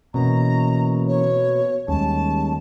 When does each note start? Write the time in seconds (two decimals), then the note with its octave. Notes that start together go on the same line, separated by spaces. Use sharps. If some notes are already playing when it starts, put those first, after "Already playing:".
0.14 B2 E3 A#3 C#4 A#5
1.08 C#5
1.88 D#2 G3 G#3 C#4 A5